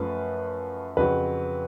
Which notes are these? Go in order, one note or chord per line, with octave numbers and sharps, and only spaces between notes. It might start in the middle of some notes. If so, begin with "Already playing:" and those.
Already playing: F#2 F3 A3 C#4 B4
F2 C#3 F#3 B4